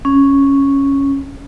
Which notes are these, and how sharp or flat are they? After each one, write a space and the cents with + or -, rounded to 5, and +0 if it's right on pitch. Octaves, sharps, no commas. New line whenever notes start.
C#4 -5